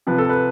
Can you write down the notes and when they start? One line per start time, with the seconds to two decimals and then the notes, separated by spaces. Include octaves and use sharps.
0.07 C3 F3 B4
0.18 A4
0.29 B4